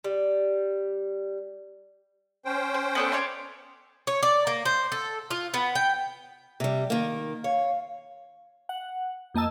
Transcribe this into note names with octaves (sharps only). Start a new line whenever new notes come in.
G3
C#4 C5 G5
C6
B3 D4 A4
C#5 D5 C6
C#5
D5
A#3
C5
A4
F4
B3
G5
C3 G3
D#3 A#3
C#5 F5
F#5
F2 A#3 D#5 A5 E6